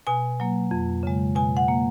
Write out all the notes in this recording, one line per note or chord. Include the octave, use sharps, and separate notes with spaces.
B2 G#5
F#3 A#3
F2
C#3 G#3
B2 G#5
F#5
A#3